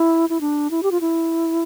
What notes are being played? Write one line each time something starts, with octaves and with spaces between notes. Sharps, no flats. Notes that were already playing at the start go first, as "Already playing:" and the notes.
Already playing: E4
E4
D4
E4
G4
F4
E4